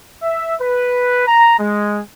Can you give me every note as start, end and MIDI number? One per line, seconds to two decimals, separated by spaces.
0.22 0.55 76
0.60 1.24 71
1.27 1.59 82
1.59 1.99 56